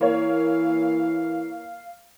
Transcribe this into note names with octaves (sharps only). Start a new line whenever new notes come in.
E3 A#3 C#5 F5